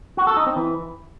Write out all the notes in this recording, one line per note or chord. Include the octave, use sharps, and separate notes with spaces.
F#4
A4
D#4
C4
E3